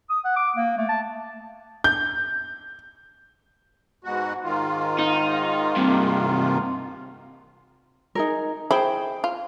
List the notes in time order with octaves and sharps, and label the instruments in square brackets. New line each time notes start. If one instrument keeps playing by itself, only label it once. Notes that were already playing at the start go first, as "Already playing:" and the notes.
[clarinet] D#6
F#5
D6
A#3
A3
A5
[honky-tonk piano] G6
[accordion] G#2 B2 F#4
G#2 D#3 F4
[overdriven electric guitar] D#4
G2 C3
[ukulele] D#4 G#4 A#4
[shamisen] E4 [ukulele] G#4 C5 G5
[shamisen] F4